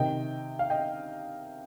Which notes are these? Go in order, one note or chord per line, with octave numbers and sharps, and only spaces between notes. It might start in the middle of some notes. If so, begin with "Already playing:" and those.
Already playing: C3 D#3 D#5 G5
F5
D#5 G5